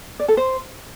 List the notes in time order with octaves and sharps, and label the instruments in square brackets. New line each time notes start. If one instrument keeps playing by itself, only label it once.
[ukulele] D5
A4
C5